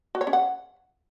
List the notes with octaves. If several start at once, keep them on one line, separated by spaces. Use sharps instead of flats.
F#4
C#5
C#4
F#5